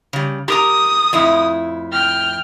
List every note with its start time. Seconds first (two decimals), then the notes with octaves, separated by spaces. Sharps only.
0.13 C#3 G3
0.48 G4 A#4 A#5 D#6
1.13 F2 A2 E4
1.91 G5 F6